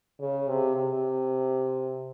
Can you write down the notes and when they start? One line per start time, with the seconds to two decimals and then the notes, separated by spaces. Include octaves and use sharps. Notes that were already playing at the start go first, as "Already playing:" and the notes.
0.20 C#3
0.48 C3
0.76 C3